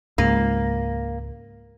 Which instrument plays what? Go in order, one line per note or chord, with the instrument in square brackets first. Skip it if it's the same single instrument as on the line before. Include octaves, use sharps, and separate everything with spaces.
[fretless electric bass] C#2 G#2 [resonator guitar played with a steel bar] A#3